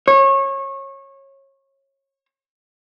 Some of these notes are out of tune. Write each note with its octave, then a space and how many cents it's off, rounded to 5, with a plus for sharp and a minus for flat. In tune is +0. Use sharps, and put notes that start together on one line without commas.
C#5 -25